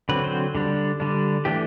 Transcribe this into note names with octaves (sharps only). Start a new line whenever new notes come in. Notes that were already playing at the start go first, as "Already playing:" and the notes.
D3 F#3 C4 B4
C5
D3 G3 D4
D3 G3 D4
E3 A3 D4 G4